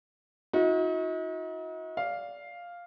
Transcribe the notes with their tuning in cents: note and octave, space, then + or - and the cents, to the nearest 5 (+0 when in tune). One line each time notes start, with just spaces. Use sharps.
D#4 +40 F#4 -35
D5 -20 F5 +0